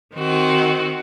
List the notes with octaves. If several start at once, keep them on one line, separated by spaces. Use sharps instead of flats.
D#3 C4 F#4